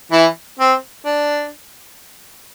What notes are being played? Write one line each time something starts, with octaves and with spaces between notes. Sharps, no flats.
E3 E4
C4
D4